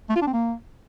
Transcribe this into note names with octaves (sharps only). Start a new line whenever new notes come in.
A3
F4
D4
C4
A#3